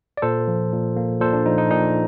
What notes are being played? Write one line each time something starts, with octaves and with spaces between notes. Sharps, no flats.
D5
A#2 A4 C5
F3
A#2
A#3
A#2 A4 C5
D4
F3 D#4
D#4
A#2 D#4